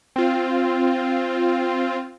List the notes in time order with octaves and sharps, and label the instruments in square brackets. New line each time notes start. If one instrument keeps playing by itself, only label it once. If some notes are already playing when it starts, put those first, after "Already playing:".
[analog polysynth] C4 F4